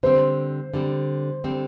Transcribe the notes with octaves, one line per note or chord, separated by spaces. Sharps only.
D3 G3 C4 C5
D3 G3 C4
D3 G3 C4